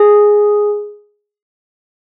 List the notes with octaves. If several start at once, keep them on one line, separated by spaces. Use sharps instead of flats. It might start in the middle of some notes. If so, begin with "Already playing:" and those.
Already playing: G#4